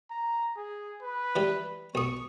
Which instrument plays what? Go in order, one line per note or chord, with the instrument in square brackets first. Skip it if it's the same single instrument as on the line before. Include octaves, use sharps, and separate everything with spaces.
[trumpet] A#5
G#4
B4
[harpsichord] E3 G3
[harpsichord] B1 D#6 [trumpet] C#6